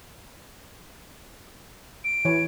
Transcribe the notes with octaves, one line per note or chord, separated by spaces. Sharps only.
D7
E3 B4 C#5